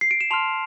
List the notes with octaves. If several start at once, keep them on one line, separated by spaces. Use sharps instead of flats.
C7
D7
E7
A5 C6 F6 F7